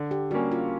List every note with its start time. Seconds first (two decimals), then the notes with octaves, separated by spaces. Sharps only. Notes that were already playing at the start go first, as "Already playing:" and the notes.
Already playing: D3
0.11 G4
0.31 G3 A#3 C#4 F#4
0.52 F4